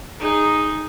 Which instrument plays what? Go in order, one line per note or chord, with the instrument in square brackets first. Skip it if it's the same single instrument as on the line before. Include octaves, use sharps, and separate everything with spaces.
[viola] D#4 G#4